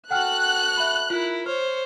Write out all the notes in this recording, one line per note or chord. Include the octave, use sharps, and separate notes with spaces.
F#4 A4 F#5 G5 F6 F#6
E5 B5
E4 F4 A#4
C5 C#5 F6